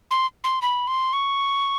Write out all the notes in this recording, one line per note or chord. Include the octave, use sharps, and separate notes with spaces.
C6
C6
B5
C6
C#6